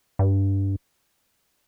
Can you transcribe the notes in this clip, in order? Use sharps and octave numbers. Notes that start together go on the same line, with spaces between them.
G2